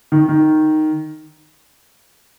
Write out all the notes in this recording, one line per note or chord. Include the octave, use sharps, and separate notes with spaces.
D#3
D#3